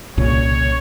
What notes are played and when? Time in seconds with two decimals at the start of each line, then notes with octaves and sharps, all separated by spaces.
0.17 C2 A#2 C#3 C#5